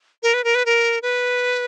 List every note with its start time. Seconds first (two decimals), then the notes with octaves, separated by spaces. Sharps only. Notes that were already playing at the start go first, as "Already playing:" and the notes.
0.23 A#4
0.34 B4
0.44 A#4
0.55 B4
0.66 A#4
1.02 B4